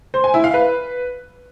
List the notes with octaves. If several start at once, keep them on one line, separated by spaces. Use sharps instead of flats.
C5
G#5
E4
F5
B4